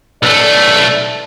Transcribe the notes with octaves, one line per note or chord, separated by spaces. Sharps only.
B1 A3 D5